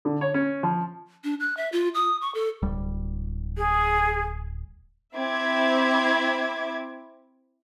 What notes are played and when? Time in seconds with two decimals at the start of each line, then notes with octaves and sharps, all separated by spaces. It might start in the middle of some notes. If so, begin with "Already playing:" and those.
0.05 D3
0.21 C#5
0.34 C#4
0.63 F3
1.24 D4
1.40 F#6
1.57 E5
1.72 F4
1.94 D#6
2.21 C#6
2.35 A4
2.62 D1 G3
3.57 G#4
5.16 C4 E4 E5 D6 G#6